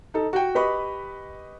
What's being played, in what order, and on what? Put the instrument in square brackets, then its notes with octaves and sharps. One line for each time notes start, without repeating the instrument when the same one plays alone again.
[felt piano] D#4 A4
F#4 G5
G4 B4 D#5 B5 C#6